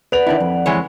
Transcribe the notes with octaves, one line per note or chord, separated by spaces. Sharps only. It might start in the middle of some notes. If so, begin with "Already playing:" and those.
B4 D5 F#5 F7
D#3 D4 E4
F2
E3 G#3 C#5